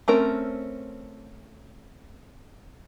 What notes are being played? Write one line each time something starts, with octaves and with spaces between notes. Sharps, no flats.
A3 C4 C#4 A#4